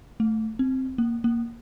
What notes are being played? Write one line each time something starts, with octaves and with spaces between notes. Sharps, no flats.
A3
C4
A#3
A#3